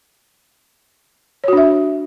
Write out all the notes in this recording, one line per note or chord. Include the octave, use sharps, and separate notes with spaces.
D4 F#4 C#5 E5